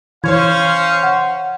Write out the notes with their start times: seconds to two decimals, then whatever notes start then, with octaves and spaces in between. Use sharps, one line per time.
0.24 E3 C#4 C5 C#5 F5 G#6
1.03 F#5